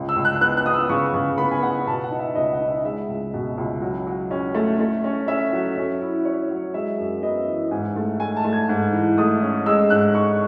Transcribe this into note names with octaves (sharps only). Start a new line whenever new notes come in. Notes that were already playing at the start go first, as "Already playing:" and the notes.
Already playing: C#2
E6
C#2
F#6
B3 F#6
F#6
B3 D#6
E6
C#3 C#6
C#3
B3 B5
G#5
B3 F#5
B2 A5
F#5
D#4
E5
C#2 D#5
F#5
D#4
E5
G#3 E5
C#2
B2
C#2
F#3
F#3
C#4
A3
A3
C#4
C#4 E5
F#3
C#4
E4
E4 C#5
F#3
G#3 E5
F#2
B3 D#5
E3
G#2 G#5
A3
A3 G#5
A5
A3
G#6
G#2
E3
A3 D#6
C#4
G#3 E6
G#2 F#6
G#3 C#6